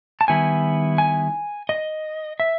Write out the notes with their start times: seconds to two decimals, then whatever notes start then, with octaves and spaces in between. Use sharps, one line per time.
0.21 A5
0.28 D#3 G3 B3 E4 G#5
0.98 G#5
1.69 D#5
2.40 E5